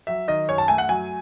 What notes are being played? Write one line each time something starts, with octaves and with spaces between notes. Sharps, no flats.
F#3 E5
D#3 D#5
F#2 C#5
A5
A3 G#5
F#5
F#3 G#5